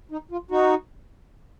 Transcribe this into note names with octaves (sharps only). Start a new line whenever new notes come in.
D#4
F4
D#4 F#4